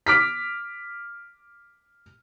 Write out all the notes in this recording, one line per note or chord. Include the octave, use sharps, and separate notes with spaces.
D6 F6 B6